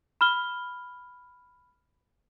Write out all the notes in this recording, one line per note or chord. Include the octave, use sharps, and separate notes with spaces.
B5 F6 G7